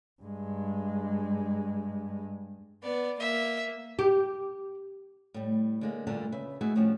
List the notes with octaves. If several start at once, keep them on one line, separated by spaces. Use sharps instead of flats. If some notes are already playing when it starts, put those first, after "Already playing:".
G2 G#3
B3 D5
A#3 E5
G4
A2 G3
D3 G#3 A#3
D2 G2 A#2 D3 A3 A5
C#3 B4 E5
A3 B3 D#4 E4 F#4 G#4
A2 F3 G3 C#4 D4 F#4